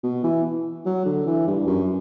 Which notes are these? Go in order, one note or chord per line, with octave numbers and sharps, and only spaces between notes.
B2
E3
F#3
D3
E3
G2
F#2